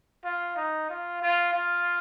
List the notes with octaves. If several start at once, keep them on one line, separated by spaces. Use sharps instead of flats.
F4
D#4
F4
F4
F4